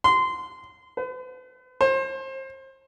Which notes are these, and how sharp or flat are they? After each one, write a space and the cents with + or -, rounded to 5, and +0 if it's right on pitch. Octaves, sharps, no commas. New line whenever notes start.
C6 -20
B4 +45
C5 +30